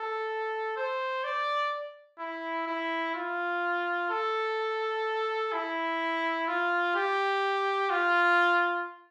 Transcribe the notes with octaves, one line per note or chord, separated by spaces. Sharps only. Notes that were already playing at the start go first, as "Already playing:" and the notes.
Already playing: A4
C5
D5
E4
E4
F4
A4
E4
F4
G4
F4